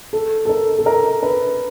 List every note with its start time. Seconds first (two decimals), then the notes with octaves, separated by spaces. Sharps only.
0.13 A4
0.45 A4
0.49 A#4
0.79 A4
0.86 A#4
1.23 B4